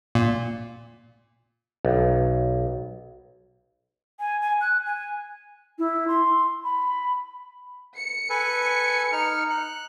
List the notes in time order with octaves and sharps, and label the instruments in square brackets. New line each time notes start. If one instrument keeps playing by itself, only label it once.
[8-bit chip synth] A#2
[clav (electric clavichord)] B1
[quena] G#5
G#5
F#6
G#5
[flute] E4
C6
B5
[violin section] C#7
[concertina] A4 B4 G#5
D#4 F6
F#6